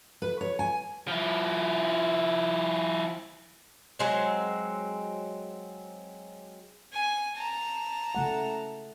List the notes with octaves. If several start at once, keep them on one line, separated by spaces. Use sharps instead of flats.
B4
C#5
G#5
F3 E4
F#3 G#3 C4
G#5
A5 A#5
C#3 A3 F#5